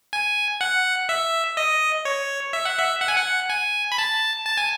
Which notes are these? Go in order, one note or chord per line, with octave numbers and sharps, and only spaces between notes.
G#5
F#5
E5
D#5
C#5
E5
F#5
E5
F#5
G#5
F#5
G#5
B5
A5
A5
G#5